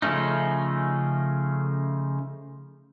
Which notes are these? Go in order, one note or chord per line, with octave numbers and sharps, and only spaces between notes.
C#3 F3 A3 C#4 D#4